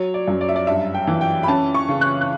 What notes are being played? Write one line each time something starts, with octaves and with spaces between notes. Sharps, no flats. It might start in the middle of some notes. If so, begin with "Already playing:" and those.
Already playing: F#3 C#5
D5
F#2
D5
E5
D5
G2 E5
G5
E3
G5
B5
C#4 A5
C#6
C#3
F#6
F#6